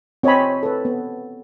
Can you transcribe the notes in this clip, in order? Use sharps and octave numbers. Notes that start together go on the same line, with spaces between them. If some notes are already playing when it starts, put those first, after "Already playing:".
C4 C#5 D#5 G#5 B5
A4 B4
B3